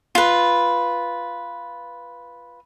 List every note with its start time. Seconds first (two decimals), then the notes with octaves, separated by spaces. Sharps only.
0.15 F4 B4